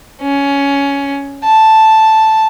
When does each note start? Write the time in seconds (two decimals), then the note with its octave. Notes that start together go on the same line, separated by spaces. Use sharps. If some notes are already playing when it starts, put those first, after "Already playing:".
0.22 C#4
1.44 A5